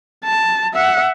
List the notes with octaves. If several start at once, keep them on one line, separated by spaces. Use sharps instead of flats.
A5
E5 F#5